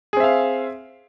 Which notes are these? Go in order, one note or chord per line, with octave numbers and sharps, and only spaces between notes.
C4 G#4 E5 F5